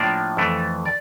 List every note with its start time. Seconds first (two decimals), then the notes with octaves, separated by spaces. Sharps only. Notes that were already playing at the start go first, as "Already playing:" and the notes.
Already playing: A2 F3 A#3 D4 D5
0.37 F2 E3 A3
0.85 D5